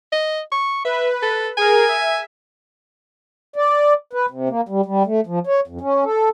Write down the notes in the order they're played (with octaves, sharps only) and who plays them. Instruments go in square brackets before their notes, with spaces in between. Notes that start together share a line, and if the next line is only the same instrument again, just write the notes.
[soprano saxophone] D#5
C#6
[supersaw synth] B4 [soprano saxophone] E5
[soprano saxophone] A4
[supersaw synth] G#4 A#4 [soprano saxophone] G#5
[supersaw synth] E5
[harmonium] D5
B4
C3
A#3
G3
G3
A3
F3
C#5
F2
C#4
A4